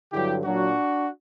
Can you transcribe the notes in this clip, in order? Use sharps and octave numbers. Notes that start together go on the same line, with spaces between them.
G2 D3 F#3 E4 G4
A#2 F#3 D4 F#4